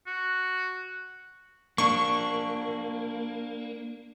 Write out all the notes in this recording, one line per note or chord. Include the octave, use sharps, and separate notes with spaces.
F#4
A#3 D4 C#6